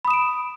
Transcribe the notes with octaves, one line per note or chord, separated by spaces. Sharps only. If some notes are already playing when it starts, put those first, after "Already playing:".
B5 D#6 D7 E7